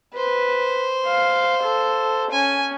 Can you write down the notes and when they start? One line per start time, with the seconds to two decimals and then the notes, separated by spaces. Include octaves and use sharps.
0.17 B4 C5
1.08 F5
1.64 A4
2.31 C#4 G#5